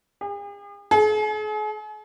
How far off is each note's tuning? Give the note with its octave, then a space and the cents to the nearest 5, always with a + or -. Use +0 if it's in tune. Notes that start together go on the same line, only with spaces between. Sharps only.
G#4 -45
G#4 +40